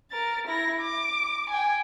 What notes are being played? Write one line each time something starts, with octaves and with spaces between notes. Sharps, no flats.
A#4 A6
E4 A#6
D6
G5 G#5